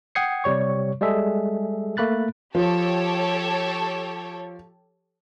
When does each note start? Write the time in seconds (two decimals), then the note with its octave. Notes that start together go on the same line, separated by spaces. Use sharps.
0.15 F#5 G5 D#6 G#6 C7 C#7
0.44 C3 G3 C#5 C#6
1.01 G3 G#3 G#4 A4 E5
1.97 A3 A#3 B5 F#6 A6
2.55 F3 G4 A4 C#5